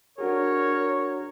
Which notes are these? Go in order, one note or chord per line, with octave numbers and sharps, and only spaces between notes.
D4 F#4 G#4 A#4 C#5